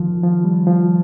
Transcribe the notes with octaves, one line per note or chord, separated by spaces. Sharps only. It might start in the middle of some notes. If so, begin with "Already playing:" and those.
Already playing: D#3 F3
F3
G3
F3